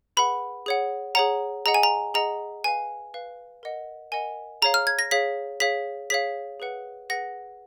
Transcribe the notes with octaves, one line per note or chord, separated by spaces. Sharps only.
G#4 B4 F#5 B5
G#4 C#5 F#5
G#4 C#5 F#5 A#5
G#4 D#5 F#5 A#5
G#5
A#5
G#4 D#5 F#5 A#5
B4 F5 G#5
B4 F5
A#4 D#5 F#5
A#4 D#5 F#5 G#5
G#4 C#5 F5 A#5
F6
G#6
A#6
G#4 C#5 F5 B6
G#4 C#5 F5 B6
G#4 C#5 F5 B6
G#4 B4 F#5
G#4 B4 F#5 A#6